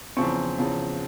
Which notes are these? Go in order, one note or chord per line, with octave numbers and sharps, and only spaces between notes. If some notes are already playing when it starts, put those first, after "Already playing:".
E2 C#3 F3 C4 C#6
E2 C#3 F3 C4